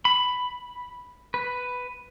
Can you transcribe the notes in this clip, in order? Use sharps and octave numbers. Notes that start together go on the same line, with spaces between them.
B5
B4